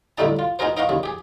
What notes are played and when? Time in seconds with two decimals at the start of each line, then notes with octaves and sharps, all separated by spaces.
0.18 A2 D3 G3 A3 D#4 A5
0.39 F4
0.59 B3 D#4 F#4 G#4 A#4 C5
0.77 D#4 A#4 F5 F#5 C#6
0.89 D#2 C#3
1.03 G4 G#4